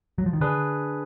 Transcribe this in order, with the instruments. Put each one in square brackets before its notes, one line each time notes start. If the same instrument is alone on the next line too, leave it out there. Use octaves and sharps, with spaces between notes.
[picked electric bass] F#3
F3
D#3
[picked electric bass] D3 [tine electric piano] D4 G#4 B4